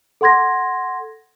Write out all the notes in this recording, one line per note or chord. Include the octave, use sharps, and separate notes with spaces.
A4 F#5 C6 G#6 A#6